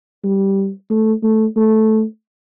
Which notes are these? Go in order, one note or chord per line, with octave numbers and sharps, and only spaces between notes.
G3
A3
A3
A3